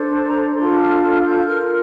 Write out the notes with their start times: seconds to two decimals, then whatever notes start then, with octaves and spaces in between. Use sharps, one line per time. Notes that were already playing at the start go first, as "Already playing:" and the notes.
Already playing: D4 A4 C5
0.10 A5
0.25 A#5
0.40 A#5
0.55 D4 F4 A4 C6
0.78 F6
1.01 F6
1.24 G6
1.46 F4 A#4 F6